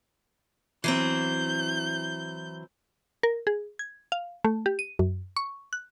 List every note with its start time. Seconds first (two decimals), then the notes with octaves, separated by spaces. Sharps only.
0.84 E3 F#3 C4 G6
3.23 A#4
3.47 G#4
3.79 G#6
4.12 F5
4.44 A3
4.66 G4
4.79 D#7
4.99 F#2
5.36 C#6
5.73 F#6